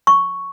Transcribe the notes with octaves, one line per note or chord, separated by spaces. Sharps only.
C#6